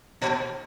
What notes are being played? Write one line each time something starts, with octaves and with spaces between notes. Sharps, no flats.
A#2